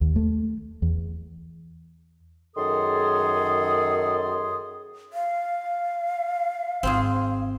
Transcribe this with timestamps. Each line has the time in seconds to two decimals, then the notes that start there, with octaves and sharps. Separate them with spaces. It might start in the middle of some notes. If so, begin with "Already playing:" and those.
0.01 D#2
0.16 A3
0.82 E2
2.56 F#2 D#3 G#4 A4 C6 D#6
5.13 F5
6.83 G#1 C4 F4 G#4